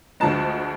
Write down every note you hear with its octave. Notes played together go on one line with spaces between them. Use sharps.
D2 D3 F3 G#3 A5